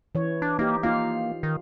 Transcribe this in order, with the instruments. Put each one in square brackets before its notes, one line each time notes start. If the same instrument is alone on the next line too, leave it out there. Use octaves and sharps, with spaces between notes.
[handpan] E3 C#5
[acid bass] D4
[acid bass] A#3 [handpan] D#4 G4
[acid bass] A#3 [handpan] D#4 F4 F5
[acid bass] D#3